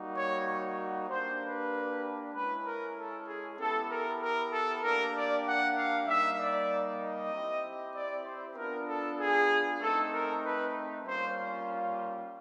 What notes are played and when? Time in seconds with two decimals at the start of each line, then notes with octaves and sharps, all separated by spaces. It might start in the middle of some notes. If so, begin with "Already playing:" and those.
Already playing: G3 A#3 D#4 F#4
0.16 C#5
1.09 A#3 D4 G4 C5
1.41 B4
2.34 G#3 C#4 E4 B4
2.64 A#4
2.96 A4
3.27 G#4
3.58 B3 E4 G4 A4
3.89 A#4
4.21 A#4
4.51 A4
4.82 A#3 D4 G4 A#4
5.14 D5
5.45 F#5
5.76 F5
6.07 G3 A#3 D#4 E5
6.38 D5
7.00 D#5
7.32 C4 E4 G4
7.94 D5
8.24 C5
8.57 B3 D4 F4 A#4
8.88 A4
9.19 G#4
9.80 A3 C4 D#4 A4
10.12 A#4
10.43 B4
11.05 G3 A#3 C#4 F4 C5